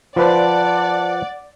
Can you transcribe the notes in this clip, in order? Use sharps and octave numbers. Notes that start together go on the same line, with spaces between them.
F3 B4 C5 D5 F#5 A5